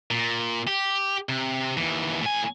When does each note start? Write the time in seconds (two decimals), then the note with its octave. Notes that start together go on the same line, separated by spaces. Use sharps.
0.11 A#2
0.67 G4
1.29 C3
1.77 D#2 E3
2.22 A2 G#5